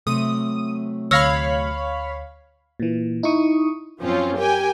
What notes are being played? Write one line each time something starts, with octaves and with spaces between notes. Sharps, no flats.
C3 F#3 A3 D#6
D2 C#5 F5 B5 E6 F6 A#6
A#2 E3
D#4 E4 C#6 D#6
F#2 F3 C4 C#4 F4
G4 A#4 G5 G#5